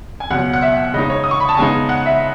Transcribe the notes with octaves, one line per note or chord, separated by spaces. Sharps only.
G#5
C#2 B2 F#3 F#5
F#5
E5
C#3 G#3 D#4 D#5
C#5
D#6
C#6
B5
A5
C#3 G#3 B3 D#4 G#5
F#5
E5